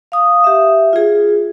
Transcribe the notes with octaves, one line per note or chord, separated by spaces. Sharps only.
F5 D#6
G4 E5
F4 G#4